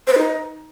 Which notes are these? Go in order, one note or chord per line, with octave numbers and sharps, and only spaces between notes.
C5
B4
D#4